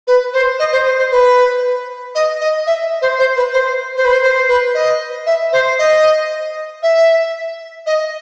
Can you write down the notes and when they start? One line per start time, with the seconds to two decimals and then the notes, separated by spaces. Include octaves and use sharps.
0.07 B4
0.33 C5
0.59 D#5
0.72 C5
0.85 C5
0.98 C5
1.11 B4
2.15 D#5
2.41 D#5
2.67 E5
3.02 C5
3.19 C5
3.36 B4
3.53 C5
3.97 C5
4.05 B4
4.12 C5
4.23 C5
4.49 B4
4.74 D#5
5.26 E5
5.52 C5
5.79 D#5
6.83 E5
7.86 D#5